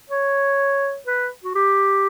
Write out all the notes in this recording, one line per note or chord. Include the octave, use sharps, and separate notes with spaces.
C#5
B4
F#4
G4